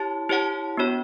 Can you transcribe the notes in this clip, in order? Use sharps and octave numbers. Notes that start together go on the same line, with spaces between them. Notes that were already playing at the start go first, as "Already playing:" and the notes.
Already playing: E4 G4 C#5 A5
E4 G4 C#5 F#5 A5
B3 D4 F#4 C#5